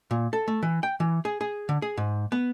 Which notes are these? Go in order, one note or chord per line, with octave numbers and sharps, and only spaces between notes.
A#2
A4
A3
E3
G5
E3
G#4
G#4
D3
G#4
G#2
B3